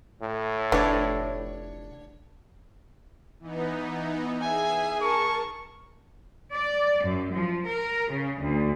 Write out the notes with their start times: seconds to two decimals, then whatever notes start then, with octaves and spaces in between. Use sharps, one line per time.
0.22 A2
0.72 F1 E3 D4 C#5
3.40 E3 B3 D#4
4.41 G#4 E5 G#5
5.02 A#4 A5 C#6
6.53 D5
7.05 F#2
7.34 F3
7.67 A#4
8.11 C#3
8.42 D2